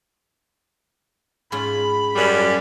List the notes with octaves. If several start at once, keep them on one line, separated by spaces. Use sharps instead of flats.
G#2 C#4 F4 B5
F#2 G3